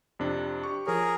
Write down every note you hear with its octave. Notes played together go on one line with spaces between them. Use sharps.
F2 C3 D4
G4 C#6
F3 G#4 A#4 C#5